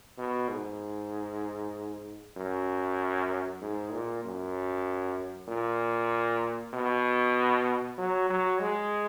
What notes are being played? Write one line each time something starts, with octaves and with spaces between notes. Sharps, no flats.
B2
G#2
F#2
G#2
A#2
F#2
A#2
B2
F#3
F#3
G#3